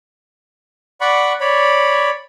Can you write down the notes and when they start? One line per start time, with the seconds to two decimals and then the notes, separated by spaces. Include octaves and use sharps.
1.01 D5 F#5 B5 C#6
1.41 C#5 D5 B5